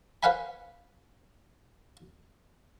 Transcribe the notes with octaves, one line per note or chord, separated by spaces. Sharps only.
B4 C5 F5 F#5 G#5 B5